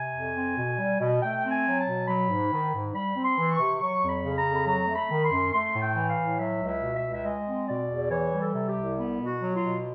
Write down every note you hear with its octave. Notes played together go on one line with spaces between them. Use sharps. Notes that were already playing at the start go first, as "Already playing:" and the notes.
Already playing: C3 G#5
F2
C4
B2
G3
B2
A3 G5
C4
G#5
F#3
A5
B2
F#3 B5
G#2
D#3
G#2
G3 B5
C4
C6
E3
C#6
C3
F#3 C#6
F2
B5
C#3
A#5
F2
B5
F#3 A#5
A3
B5
D#3
C6
F#2
A3 C6
A2
G5
E3
F5
A2
F#3 E5
C#2
E5
B2
E5
C#2
E5
G#3 D#5
C4
B2 D5
E2
E3 C#5
G3
A4
C3
G4
C2
B3
B2
F#4
F#3
F4
B2